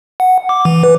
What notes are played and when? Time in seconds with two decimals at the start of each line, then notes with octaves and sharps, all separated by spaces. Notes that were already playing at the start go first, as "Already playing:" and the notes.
0.20 F#5
0.49 D6
0.65 E3
0.83 B4